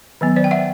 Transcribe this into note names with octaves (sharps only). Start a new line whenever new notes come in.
D#3 F#3 B3
C5 D5
G5
E5 F#5